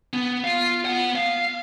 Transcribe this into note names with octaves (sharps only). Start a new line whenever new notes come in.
B3
F4 F5
B3 F#5
F5